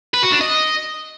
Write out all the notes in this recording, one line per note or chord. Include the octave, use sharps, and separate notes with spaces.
B4
F#4
D4
D#5